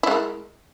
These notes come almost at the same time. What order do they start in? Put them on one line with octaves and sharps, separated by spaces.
E4 G#3 A#4